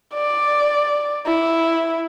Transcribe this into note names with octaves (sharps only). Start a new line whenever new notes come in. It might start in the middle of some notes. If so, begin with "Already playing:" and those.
D5
E4